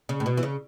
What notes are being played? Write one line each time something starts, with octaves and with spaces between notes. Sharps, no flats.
C#3
A2
B2
E3
C#3